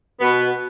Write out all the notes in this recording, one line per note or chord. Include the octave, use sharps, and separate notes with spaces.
B2 B3